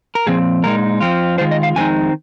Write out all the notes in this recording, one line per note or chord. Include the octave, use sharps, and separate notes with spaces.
A#4
A#2 F3 C4 G#4
A#2 G#3 D#4 A#4
F2 F3 C4 F4
D#3 G#3 F4 C5
D#5
F5
F2 D#3 G#3 C4 D#4 G#5